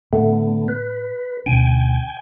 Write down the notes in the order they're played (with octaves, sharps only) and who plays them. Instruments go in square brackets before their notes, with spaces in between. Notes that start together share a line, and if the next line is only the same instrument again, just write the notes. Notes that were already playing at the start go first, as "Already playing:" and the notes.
[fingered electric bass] A2 [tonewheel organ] D3 A3 B3
[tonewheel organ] B4
[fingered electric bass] D2 B2 C#4 [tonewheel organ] G5 G#5